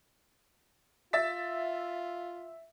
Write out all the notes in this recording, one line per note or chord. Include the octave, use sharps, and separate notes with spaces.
F4 E5 A6 B6